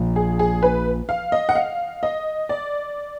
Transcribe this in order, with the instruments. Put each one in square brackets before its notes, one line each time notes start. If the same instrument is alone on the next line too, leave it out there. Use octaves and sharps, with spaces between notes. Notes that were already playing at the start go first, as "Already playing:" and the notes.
Already playing: [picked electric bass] A#1 A#2 F3
[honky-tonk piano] G#4
G#4
B4
F5
D#5
F#5
F5
D#5
D5